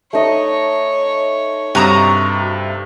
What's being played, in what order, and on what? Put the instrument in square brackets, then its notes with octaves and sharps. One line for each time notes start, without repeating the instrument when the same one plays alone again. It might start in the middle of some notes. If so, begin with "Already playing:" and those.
[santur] A3 D#4 D#5 [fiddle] C#5
[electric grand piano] G2 C3 [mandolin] F#4 A#5 D#6